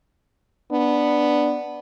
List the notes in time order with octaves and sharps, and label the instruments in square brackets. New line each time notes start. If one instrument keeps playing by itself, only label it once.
[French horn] B3 [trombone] D4